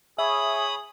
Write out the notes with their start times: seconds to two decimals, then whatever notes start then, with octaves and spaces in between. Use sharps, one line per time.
0.18 G#4 C#5 E5 B5 D#6